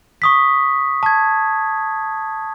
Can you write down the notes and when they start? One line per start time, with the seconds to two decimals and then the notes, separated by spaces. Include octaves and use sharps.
0.22 C#6 D#6 B6
1.03 A5 G#6